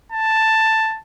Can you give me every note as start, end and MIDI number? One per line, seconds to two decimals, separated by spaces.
0.12 1.00 81